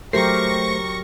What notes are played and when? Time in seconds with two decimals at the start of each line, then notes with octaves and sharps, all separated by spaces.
0.13 F#3 A3 G4 A#4 C5 C#6 A#6 C7